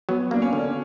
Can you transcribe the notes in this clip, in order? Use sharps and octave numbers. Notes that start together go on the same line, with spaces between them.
F#3 B3
A#3 D4
C#4
D3
D4